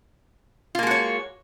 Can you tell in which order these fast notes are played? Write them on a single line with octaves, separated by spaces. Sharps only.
F4 A#3 G#3 F#4 C#5